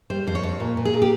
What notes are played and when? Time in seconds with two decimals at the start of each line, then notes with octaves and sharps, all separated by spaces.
0.10 G3 C5
0.27 F2 C5
0.35 C#5
0.43 F2
0.60 A#2
0.77 A#2
0.85 G#4
0.93 A#2
1.02 G4